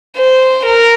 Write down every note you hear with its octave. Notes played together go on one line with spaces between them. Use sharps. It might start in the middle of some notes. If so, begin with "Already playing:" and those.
C5
A#4